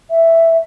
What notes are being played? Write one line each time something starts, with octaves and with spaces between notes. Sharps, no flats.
E5